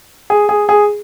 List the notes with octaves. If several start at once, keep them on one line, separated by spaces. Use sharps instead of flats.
G#4
G#4
G#4